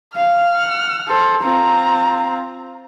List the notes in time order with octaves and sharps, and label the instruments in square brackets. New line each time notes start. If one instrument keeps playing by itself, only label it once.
[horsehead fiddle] F5 [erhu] F6
[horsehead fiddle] F#5
A4 C5
[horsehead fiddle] C4 F4 [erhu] A#5